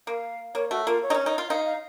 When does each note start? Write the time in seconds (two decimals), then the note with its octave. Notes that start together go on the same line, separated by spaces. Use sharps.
0.07 A#3 F5
0.55 A#3 C#5
0.71 A3 F#4
0.87 A#3 F4
1.03 C#5
1.10 D#4
1.14 C#4
1.26 D#4
1.38 F4
1.50 D#4 F5
1.66 F5